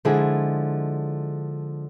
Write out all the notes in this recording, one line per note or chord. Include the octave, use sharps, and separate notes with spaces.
D3 F3 G#3 E4 G#4